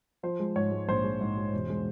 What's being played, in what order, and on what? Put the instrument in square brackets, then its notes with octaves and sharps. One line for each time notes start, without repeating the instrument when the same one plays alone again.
[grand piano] F3 C5
G#3
G#2 C#5
G#3
A#1 C5
G#3
G#2
G#3
E1
G#3